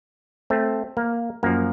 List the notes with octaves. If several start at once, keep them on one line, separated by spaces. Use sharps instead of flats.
A3 C4
A#3
F#2 F3 A#3